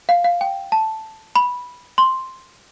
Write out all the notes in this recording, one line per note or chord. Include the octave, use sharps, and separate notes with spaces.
F5
F5
G5
A5
B5
C6